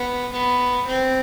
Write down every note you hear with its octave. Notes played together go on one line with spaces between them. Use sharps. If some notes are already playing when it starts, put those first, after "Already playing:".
Already playing: B3
B3
C4